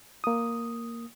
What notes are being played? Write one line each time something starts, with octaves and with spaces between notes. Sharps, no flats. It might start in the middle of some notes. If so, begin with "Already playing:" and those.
A#3 D#6